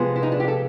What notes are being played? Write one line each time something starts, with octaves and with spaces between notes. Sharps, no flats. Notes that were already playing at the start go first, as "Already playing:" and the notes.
Already playing: C3 F3 G#3 B3
E4
D#4
D4
G4
A4